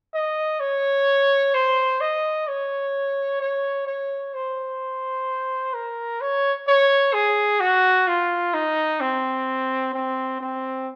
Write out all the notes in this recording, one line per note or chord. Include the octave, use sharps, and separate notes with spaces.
D#5
C#5
C5
D#5
C#5
C#5
C#5
C5
A#4
C#5
C#5
G#4
F#4
F4
D#4
C4
C4
C4